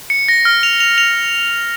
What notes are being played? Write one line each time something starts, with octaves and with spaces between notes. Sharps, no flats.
C#7
A#6
F6
F7
F7
F7